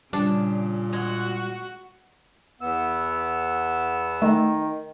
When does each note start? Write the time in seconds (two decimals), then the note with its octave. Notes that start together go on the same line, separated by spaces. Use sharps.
0.13 A#2 C#3 G3 D4
0.93 G#3 F#4
2.61 E2 B3 E6
4.22 D#3 A3